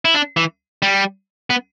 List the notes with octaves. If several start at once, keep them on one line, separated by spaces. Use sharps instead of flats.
E4
D4
E3
G3
B3